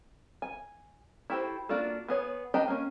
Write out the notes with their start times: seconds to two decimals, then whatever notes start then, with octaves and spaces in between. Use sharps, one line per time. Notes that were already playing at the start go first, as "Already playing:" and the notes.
0.42 G#5
1.30 E4 F#4 G4 A4 C5
1.69 A#3 D4 F4 F#4 A4
2.08 B3 G#4 C#5
2.54 D4 G4 D#5 G5 A#5
2.68 A#3 C#4